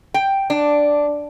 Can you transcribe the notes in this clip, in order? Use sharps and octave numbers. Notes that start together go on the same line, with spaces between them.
G5
D4